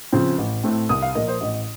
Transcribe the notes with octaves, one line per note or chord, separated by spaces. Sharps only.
C#3 F3 C4
A1
A2 A3 C4
C2 D#6
F5
A#2 F3 A#3 D#5
C5
A1 D#5